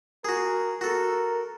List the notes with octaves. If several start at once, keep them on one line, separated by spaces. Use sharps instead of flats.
F#4 G#4 A#4
F#4 A4 A#4